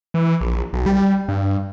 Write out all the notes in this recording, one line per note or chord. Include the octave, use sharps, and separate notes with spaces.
E3
A#1
B1
G3
G2